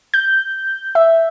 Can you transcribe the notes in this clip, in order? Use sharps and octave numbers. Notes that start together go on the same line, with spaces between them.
G6
E5